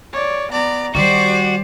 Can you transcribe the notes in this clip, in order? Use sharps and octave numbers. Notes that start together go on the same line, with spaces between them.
C#5 D5
B3 D5 A#5
D#3 G3 F#4 G4 C5 D5